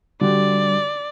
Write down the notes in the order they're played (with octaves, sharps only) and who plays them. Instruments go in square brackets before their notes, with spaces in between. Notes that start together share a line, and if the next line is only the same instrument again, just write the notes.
[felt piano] D3 F#4 G4 [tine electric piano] G3 [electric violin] D5